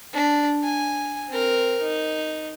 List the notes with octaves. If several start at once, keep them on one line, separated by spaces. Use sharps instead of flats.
D4
G#5
C4 A#4
D#4